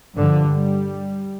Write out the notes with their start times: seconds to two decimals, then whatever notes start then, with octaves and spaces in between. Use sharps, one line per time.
0.14 G2 D3 F3
0.46 G3